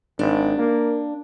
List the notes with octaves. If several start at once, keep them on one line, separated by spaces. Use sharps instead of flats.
G#1 D4
A#3